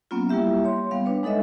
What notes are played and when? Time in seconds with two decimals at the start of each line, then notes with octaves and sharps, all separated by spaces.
0.11 F#3 A#3 B3 C#4 F4
0.29 G3 A#3 E4 G4 E5
0.64 C#5 C6
0.91 G3 B3 F5
1.05 D4 B4 C#5
1.23 G#3 D#4 A4 D#5 E5